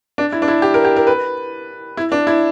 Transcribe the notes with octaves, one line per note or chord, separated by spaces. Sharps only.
D4
E4
D4
E4
G4
A#4
G4
A#4
B4
E4
D4
E4